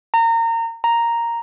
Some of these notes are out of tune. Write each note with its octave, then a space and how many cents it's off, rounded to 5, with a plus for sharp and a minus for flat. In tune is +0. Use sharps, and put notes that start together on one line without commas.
A#5 -25
A#5 +0